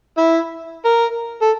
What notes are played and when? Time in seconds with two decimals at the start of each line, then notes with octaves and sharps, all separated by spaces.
0.18 E4
0.85 A#4
1.42 A4